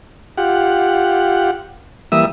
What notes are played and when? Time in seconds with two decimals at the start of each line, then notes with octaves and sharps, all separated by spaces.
0.37 F4 G4 F#5
2.12 E3 G3 A#3 E5 D#6 E6